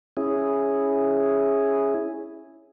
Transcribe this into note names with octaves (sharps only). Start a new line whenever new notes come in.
C#4 E4 G#4